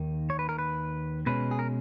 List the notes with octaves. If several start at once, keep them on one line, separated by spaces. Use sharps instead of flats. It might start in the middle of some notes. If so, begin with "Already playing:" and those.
Already playing: D#2 D#3 A#3
C#5
B4
A#4
B4
B2 G#3 C#4 B4
G#4
A#4